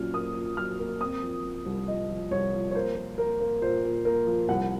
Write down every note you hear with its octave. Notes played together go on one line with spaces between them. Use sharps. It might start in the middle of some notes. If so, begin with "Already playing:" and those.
Already playing: A#2 F#3 C#4 F6
A#3 D#6
A#2
F#3 F6
A#3
C4 D#6
F3
F3
C2
F3 D#5
F3
C2 C#5
F3
C#5
A#3 C5
A#3
A#3 A#4
A#3
A#2 C5
A#2
A#3 A#4
F3
C2 F#5